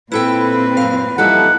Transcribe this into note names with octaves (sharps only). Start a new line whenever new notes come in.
A#2 C4 E4 A4 B4 G5
F#2 F5
E3 F3 G3 D#4 E4 A4 F#5